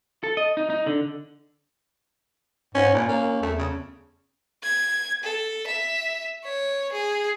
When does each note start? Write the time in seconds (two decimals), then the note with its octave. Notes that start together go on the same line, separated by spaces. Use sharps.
0.23 A4
0.37 D#5
0.57 D#4
0.70 D#4
0.87 D3
2.75 G#2 C#4
2.94 A#2 C#4
3.09 A#3
3.42 E2 A3
3.58 C#3
4.63 G#6
5.23 A4
5.67 E5
6.44 C#5
6.92 G#4